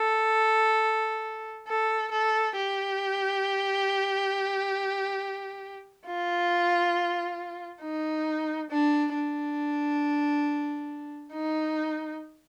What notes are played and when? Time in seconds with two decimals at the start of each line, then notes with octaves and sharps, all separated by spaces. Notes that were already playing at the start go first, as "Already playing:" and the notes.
Already playing: A4
1.68 A4
2.12 A4
2.56 G4
6.06 F4
7.81 D#4
8.70 D4
9.14 D4
11.34 D#4